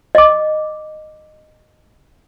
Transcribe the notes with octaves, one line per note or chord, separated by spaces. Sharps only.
D#5 D6